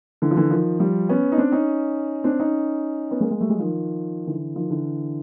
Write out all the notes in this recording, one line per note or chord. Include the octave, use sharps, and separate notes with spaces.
D3 E3
F3
D3 E3
D#3 F3
F3 G3
B3 C#4
D#4
C4 D4
C#4 D#4
C4 D4
C#4 D#4
B3 C#4
G#3 A#3
G#3 A#3
G3 A3
F#3 G#3
D#3 F3
D3 E3
D#3 F3
D3 E3